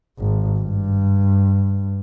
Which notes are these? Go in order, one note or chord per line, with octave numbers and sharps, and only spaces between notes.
G#1
G2